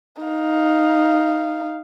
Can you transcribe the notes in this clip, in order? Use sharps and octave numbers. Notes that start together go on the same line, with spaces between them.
D#4 F5